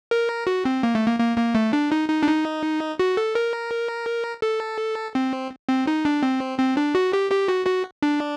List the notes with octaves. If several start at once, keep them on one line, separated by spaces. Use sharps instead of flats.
A#4
F#4
C4
A#3
A3
A#3
A#3
A#3
A3
D4
D#4
D#4
D4
D#4
F#4
A4
A#4
A4
C4
C4
D#4
D4
C4
C4
D4
F#4
G4
G4
F#4
F#4
D4